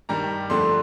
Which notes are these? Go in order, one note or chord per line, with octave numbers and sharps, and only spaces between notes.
G2 D#3 G3 A#5
F2 D3 A3 D4 C6